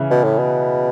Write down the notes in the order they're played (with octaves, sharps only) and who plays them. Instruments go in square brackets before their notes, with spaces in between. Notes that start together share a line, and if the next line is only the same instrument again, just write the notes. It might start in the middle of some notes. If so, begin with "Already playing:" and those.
Already playing: [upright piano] C#3 E3
[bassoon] B2
A2
B2